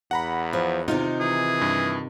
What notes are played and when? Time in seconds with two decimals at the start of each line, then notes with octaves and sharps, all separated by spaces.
0.11 E2 F#5 A#5 B5
0.53 F3
0.88 C3 D#3 D#4 F4
1.20 E3 G#4
1.61 G2